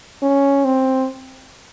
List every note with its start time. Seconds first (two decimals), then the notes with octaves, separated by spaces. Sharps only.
0.22 C#4
0.64 C4